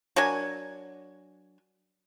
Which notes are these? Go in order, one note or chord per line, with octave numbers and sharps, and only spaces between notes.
F#3 D4 A#4 G#5